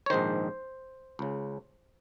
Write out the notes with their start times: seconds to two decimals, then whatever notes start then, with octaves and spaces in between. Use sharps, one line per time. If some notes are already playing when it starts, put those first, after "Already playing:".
0.06 C#5
0.10 A#1 G#2 D#3 C5
1.19 C#2 C#3